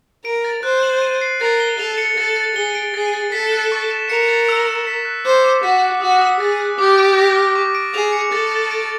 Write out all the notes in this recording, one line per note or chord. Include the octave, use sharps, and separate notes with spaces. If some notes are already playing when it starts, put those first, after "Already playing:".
A#4 D7
A6
C5 F#6
F#7
D#7
C7
A#4 A6
G7
A4 F7
C#7
A4 A6
A6
G#4 G7
D7
G#4 A6
A6
A4 B6
F#6
C#6
E7
A#4 C#7
A6
E6
E7
B6
F#6
C5 D6
D6
F#4 B6
F#6
F#4 D#6
D#6
G#4 A6
F#6
G4 D6
D7
A#6
F6
C#6
D7
G#4 F7
C#7
A4 A6
A6
D7